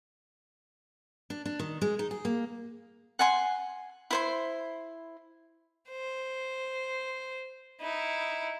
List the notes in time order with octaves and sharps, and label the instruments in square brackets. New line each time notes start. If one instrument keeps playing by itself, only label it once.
[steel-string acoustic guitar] D4
D4
D#3
G#3
D#4
G#4
A#3
[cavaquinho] F#5 G#5 C6
E4 C5 C6
[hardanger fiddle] C5
D#4 E4